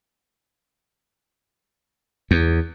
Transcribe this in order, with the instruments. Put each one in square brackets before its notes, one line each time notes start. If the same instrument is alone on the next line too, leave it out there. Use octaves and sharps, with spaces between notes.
[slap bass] E2